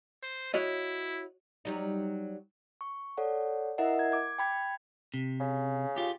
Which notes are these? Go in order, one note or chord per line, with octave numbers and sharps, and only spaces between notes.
C5
E4 F#4 C#5 D#5
F#3 G3 D#4
C#6
A4 C#5 D5 F#5
E4 A#4 D#5 E5 F#5
G#6
D6 G#6
G5 B5 G#6
C3
C#3
F4 G4